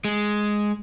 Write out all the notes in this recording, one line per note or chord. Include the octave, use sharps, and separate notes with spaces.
G#3